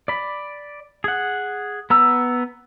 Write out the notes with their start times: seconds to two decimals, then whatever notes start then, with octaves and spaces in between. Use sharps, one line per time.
0.08 D5 B5
1.04 G#4 F#5
1.90 B3 A#5 E6